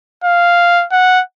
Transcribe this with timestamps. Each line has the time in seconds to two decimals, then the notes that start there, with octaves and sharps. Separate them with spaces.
0.24 F5
0.91 F#5